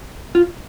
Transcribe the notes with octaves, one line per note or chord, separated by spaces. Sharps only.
F4